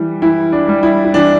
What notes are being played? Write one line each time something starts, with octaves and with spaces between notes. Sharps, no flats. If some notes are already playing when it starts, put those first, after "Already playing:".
Already playing: E3 G3
E3 E4
D4
G3
E4
E4
E3 D4